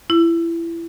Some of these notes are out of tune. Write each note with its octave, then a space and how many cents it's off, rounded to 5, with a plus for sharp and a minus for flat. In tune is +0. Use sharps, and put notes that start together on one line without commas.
E4 +25